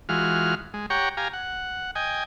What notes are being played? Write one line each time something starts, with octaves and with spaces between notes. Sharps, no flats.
E3 G#3 F4 F#4 F6
G#3
G4 C#5 F#5 G5 A#5 C#6
G4 F5 G#5 A#5
F#5
D#5 G5 G#5